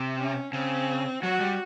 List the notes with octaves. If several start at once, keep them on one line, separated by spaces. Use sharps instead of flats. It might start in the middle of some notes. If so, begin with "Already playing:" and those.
Already playing: C3
C#4
C#3 C4
F#3 F#4
G3